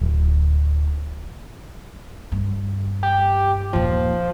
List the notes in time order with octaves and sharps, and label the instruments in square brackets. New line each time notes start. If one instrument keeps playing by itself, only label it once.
[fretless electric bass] D1
[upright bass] G2
[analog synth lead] G4
[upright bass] D#2 A#2 [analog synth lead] F3